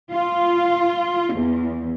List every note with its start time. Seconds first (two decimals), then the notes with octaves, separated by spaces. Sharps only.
0.12 F4
1.35 E2